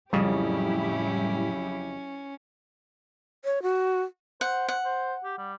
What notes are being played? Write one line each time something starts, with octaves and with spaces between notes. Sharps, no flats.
F2 A2 C#3 F#3 G3 C#4 E4 G4
C#5
F#4
C5 F#5
F#5
C5
G4
G3